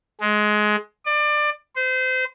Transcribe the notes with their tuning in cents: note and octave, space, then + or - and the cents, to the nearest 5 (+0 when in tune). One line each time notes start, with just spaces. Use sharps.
G#3 +20
D5 +25
C5 -30